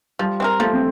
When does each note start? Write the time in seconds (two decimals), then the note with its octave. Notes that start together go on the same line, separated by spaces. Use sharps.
0.19 F3 G3
0.40 C4 G4 A#4
0.60 F3 A3
0.73 C4